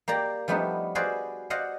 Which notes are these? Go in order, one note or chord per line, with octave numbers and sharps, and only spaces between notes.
A#3 G4 D5 A#5
F3 G3 A3 B3 D4 D#4
F#4 G#4 B4 C5 D5 F5
C5 D5 D#5 F5 F#5